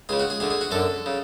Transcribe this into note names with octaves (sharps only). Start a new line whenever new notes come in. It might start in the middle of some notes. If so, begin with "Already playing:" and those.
C#2 C#3 G#4
F#4
G#4
D2 D3 G#4
G#4
F#4
F#2 D3 A4
C#3